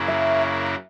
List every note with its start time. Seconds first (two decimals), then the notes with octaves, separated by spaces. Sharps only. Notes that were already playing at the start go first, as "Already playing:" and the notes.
Already playing: F#2 C#3 F#3 A#3 E4
0.08 E5